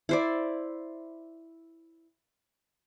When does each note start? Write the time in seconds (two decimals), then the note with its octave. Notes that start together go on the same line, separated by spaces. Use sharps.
0.09 E4 C5 D5